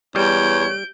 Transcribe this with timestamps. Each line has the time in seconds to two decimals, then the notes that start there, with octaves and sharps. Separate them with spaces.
0.16 E2 G3 C#5 G6 D7